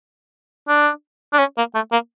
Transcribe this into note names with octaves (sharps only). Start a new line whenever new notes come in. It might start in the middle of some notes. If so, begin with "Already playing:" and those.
D4
D4
C#4
A#3
A3
A#3